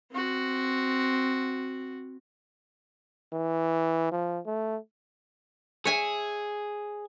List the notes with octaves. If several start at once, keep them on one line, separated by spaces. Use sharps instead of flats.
C4 F#4
E3
F3
A3
G#4 C#5 E5 G#5